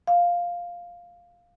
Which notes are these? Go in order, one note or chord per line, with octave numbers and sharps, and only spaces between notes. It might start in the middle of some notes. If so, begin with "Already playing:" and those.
F5